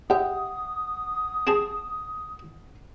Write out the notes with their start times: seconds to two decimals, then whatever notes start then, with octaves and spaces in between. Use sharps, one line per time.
0.10 G4 E5 F#5 D#6
1.47 C4 G#4 A5